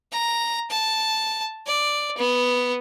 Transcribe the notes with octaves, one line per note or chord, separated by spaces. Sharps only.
A#5
A5
D5
B3